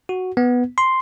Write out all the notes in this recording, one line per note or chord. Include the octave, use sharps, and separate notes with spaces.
F#4
B3
C6